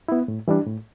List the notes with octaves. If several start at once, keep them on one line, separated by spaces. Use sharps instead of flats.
B3 E4
A2
E3 G3 D4
A2